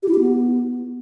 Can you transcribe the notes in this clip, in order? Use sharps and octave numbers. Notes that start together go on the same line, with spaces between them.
G4
E4
G4
B3